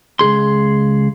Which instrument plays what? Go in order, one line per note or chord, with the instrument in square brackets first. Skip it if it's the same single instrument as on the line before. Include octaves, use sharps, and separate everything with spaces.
[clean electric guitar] C#2 A#2 G#4 C6